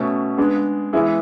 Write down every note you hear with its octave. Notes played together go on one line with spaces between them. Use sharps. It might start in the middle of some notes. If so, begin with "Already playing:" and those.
Already playing: B2 A3 C#4
G#3 B3 D4 G#4
E3 G#3 B3 E4 G#4